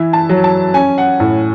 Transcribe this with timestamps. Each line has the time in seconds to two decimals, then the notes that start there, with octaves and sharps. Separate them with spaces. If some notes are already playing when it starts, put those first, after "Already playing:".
Already playing: E3 E4
0.13 A5
0.29 F#3
0.44 A5
0.74 C#4 G#5
0.98 F#5
1.20 A2